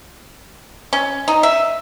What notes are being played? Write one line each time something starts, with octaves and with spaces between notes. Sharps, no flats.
C#4
D#4
E5